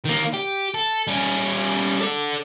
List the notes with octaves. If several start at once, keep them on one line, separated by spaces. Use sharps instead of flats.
D#3 A#3
G4
A4
G3 C#4
A4 D5